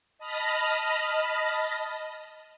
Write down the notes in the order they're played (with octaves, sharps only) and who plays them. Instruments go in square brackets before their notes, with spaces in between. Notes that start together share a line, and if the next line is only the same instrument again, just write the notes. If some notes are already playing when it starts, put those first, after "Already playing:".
[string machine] D#5 A5 B5 F6 A#6